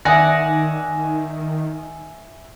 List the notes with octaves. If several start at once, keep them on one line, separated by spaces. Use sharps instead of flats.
D#3 D5 E5 F#5 G#5 D#6 A#6